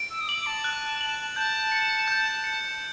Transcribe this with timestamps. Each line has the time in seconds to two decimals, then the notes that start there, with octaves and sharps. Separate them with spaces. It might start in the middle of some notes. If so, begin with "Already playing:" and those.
Already playing: D7
0.10 E6
0.21 D#6
0.28 D6 F#7
0.46 A5
0.64 F#6
1.01 F#7
1.36 A5 G6
1.72 C#7
2.08 G6
2.44 C#7